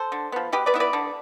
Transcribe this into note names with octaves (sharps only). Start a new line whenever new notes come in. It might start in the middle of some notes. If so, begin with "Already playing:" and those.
Already playing: A4 C5
D3
F3 B3
B2 G4 B4
B4 D5
B3 E4 E5
B4 D5
D3